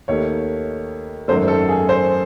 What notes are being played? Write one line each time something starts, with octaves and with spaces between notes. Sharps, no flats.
D#2 D#3 A3 C#5
G#1 F#2 D#3 A3 C5
A4
G#4
C5